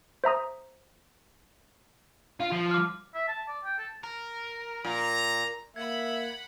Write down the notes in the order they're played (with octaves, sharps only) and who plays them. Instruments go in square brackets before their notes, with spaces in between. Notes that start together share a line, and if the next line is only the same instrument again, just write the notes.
[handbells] C5 E5 A#5 D#6
[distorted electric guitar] F4
F3
[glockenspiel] D6 F6
[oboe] E5
A5
D5
G5
A4
[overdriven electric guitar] A#4
[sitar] A#2 [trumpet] A#5
[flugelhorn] A#3 [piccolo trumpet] E5 [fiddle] F#5 B5 [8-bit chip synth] G#6